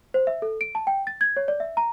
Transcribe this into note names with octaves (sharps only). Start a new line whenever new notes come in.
C5
E5
A4
D7
A5
G5
A6
G#6
C#5
D5
E5
A#5